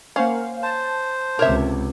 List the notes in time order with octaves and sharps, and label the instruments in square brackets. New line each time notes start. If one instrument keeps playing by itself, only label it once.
[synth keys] A#3 C5 F5 [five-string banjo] C#4 F#5
[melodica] C5 [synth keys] A5
[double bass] C#2 C3 [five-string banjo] A#4 C#5 E5